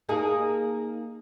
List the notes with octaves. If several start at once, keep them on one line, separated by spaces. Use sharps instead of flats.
A#3 D#4 G#4